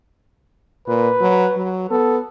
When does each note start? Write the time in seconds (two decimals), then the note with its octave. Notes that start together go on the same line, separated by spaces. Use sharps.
0.88 A#2 B4
1.21 F#3
1.57 F#3
1.91 B3 A4